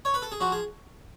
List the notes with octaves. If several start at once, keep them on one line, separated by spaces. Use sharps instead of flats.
C#5
B4
A4
G#4
F3 F#4
G#4